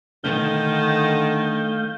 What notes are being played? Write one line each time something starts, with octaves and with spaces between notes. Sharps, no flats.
D3 D#3 A3 F5 G6